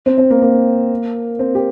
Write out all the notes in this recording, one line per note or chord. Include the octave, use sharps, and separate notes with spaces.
C4
C4
A#3
A#3
C4
G4